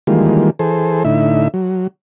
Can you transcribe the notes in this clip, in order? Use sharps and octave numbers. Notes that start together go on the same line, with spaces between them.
D#3 E3 G3 G#3 A#3 F4
E3 G#4 A4 C5
A2 D3 D#4 E4 E5
F#3